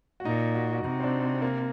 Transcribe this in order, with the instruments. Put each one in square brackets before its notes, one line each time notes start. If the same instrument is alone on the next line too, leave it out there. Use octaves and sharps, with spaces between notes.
[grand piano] F#4
[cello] A#2 [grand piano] D#4
[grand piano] F#4
F#4
[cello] C3 [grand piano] D#4
[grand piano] C4
D4
A#3